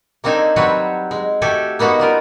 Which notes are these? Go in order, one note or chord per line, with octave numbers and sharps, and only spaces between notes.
A#3 C4 D4 D#4 A4 G#5
F#3 G3 C4 F#4 B4 C#5
G#3
A3 F#4 G4 A4 G5 G#5
A#3 B3 D#4 F#4 F#5
G3 F4 A#4